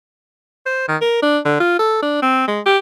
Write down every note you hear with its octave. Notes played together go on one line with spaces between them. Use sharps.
C5
D#3
A#4
D4
D3
F4
A4
D4
C4
G#3
G4